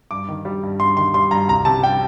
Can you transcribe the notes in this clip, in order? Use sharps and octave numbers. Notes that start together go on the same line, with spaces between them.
G2 D6
D#3
G3
G2
G2 C6
D#3 C6
G3 C6
G2 A#5
C2 A#5
C3 A5
G3 G5